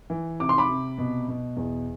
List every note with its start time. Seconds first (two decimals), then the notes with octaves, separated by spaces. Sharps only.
0.10 E3
0.40 C3 D6
0.49 C6
0.58 B5 D6
0.69 C3
0.98 B2
1.28 B2
1.57 E2